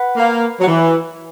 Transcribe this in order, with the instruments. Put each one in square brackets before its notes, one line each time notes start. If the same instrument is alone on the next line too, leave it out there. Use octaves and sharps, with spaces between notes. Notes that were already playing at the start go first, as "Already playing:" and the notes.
Already playing: [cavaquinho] B4 F#5 B5
[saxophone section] A#3
F#3
E3